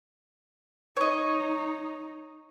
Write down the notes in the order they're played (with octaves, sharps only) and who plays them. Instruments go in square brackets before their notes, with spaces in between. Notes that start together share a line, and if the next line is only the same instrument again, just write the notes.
[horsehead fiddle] D#4 [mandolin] C#5 D#5